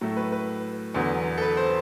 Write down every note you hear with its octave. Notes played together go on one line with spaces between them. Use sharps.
A2 F#3 A3
B4
B4
E2 D3 F#3 B3
A4
B4
C5